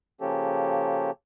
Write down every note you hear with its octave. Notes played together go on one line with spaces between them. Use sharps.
C#3 F3 A#3 C#4 G4 A4